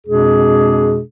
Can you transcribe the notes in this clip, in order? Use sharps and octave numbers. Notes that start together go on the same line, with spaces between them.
F2 B2 G#3 D4 G#4